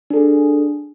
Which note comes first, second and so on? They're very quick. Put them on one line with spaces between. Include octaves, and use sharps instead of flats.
D4 A4 G#4